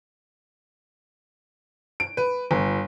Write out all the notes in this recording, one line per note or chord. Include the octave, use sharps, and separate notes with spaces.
D7
B4
G1